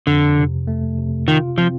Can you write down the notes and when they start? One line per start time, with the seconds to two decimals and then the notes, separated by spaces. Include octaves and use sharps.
0.07 F2 D3
0.38 C3
0.67 A3
0.98 C3
1.28 D#3 F4
1.58 F3 C4